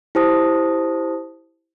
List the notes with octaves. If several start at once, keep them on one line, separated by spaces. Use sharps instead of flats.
E4 G4 C5 A5 D#6 A#6